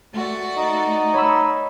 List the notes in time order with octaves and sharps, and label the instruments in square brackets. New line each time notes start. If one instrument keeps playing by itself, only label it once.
[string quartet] A3 F#4 D5
[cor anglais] D#4
[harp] C#5 B5 E6